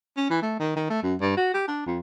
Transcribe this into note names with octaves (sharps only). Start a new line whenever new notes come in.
C#4
E3
A3
D#3
D#3
A3
F#2
G2
F#4
G4
D4
F2